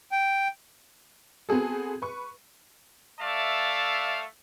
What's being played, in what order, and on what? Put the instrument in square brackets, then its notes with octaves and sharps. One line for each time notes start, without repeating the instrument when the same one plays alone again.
[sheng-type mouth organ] G5
[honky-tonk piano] B3 C4 F#4 G#4 A4
B4 C#6
[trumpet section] A3 D5 E5 F5 A5